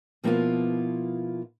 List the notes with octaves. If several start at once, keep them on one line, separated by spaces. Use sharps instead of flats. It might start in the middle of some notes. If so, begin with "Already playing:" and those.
B2 F3 A#3 B3 E4 F4